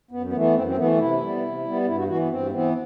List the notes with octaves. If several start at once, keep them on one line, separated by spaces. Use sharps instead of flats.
F#2 B3
B3
E3 A3
B3
F#2 C4
C4
E3 A3 B3
C3 E4
G3 B3
C3
G3 B3
G2 E4
F#4
E3 B3 F#4
B3
G2 C4
E3 B3 C4